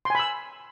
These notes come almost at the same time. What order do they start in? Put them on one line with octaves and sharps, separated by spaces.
C6 G#5 B5 E6